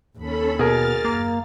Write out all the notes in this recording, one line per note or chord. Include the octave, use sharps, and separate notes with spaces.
D#2 C#4 A4 B5
B2 G#4 A#4 F6 A6
F#1 A#3